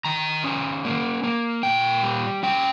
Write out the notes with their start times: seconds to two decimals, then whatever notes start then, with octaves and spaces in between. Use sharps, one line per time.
0.05 D#3 A#5
0.44 C#4
0.85 A#3
1.24 A#3
1.63 A#2 G5
2.03 G3
2.43 C#4 G5